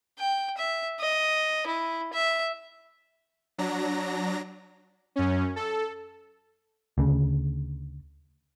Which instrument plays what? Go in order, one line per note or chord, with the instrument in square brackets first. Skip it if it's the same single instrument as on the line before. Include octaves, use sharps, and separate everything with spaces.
[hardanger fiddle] G5
E5
D#5
E4
E5
[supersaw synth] F#3 D4 A#5 A#6
F#2 C#4
A4
[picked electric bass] D2 C#3